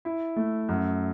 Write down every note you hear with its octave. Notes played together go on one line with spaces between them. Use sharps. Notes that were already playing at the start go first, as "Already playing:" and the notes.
E4
A3
F#2